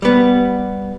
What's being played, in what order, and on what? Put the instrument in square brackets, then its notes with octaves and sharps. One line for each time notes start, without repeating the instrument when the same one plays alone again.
[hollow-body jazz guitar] G3 B3